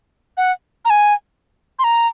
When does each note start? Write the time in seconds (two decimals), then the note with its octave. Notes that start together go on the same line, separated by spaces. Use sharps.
0.37 F#5
0.85 A#5
0.90 G#5
1.79 C6
1.84 A#5